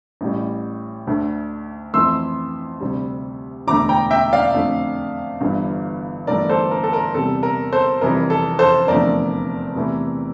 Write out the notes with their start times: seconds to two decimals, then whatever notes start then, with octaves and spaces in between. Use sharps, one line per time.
0.21 A1 A2 G3
1.07 D2 D3 A3
1.94 F2 E3 A3 C6 E6
2.81 D2 C3 G3
3.67 E1 D2 D3 A3 A#5 D6
3.89 G5 A#5
4.11 E5 G5
4.33 D5 F5
4.54 F2 D3 A3
5.41 G1 G2 E3 G3
6.27 G1 G2 E3 A3 A#4 D5
6.49 A4 C5
6.71 A#4
6.84 A4
6.93 A#4
7.14 E2 C3 G3 A4
7.43 A#4
7.73 A4 C5
8.01 F1 F2 E3 G3 A#4
8.30 A4
8.59 A4 C5
8.88 F1 E2 D3 F3 A3 A#4 D5
9.75 E2 C3 E3 A3